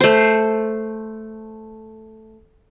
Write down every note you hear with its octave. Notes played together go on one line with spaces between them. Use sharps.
A3 C5